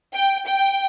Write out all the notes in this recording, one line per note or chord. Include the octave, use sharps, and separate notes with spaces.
G5
G5